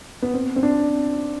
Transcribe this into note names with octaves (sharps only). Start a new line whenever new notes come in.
B3
C4
C4
D4